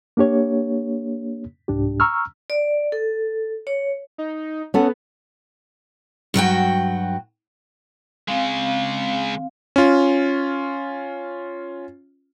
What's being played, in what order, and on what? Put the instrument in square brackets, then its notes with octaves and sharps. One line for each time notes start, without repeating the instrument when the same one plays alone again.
[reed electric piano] A#3 D4 G4 C#5
C2 G#2 D4 G4
A#5 C#6 E6 F6
[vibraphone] D5
A4
C#5
[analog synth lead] D#4
[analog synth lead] B3 [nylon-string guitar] C#4 A4 F#5
[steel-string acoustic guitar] G2 F#3 F#4 G5
[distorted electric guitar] C#3 G#3 [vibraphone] C4 F5
[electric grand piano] C#4 F4